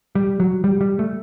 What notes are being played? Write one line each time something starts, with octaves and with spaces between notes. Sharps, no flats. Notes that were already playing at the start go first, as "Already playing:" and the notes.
G3
F#3
G3
G3
A3